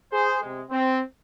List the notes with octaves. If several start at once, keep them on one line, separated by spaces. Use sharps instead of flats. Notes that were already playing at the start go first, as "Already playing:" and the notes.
G#4 C5
C3 G#3
C4